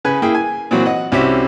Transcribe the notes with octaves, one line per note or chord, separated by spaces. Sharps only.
C#3 B4 G#5
A#3 E4 G#4 G5
G#5
A#2 E3 F#3 C4 F#4
D#5 F#5
C2 C4 C#4 F#4 G4 E5